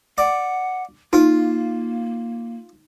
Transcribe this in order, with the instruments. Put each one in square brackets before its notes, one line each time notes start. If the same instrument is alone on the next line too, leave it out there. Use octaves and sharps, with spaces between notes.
[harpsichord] D5 [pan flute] F#5
[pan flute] A#3 [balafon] D#4 [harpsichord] F4